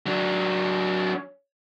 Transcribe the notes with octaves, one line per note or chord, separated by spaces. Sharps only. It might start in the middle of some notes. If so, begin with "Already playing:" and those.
F#3 D4